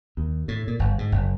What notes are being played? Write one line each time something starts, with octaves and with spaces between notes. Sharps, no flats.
D#2
A2
A#2
G1
G#2
F#1